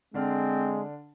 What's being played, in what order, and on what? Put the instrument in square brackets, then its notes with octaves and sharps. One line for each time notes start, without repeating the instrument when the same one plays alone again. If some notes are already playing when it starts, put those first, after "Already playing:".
[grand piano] D3 D4 F6 [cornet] G#3 [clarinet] C4